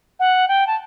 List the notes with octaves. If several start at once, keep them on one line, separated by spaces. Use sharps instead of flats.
F#5
G5
A5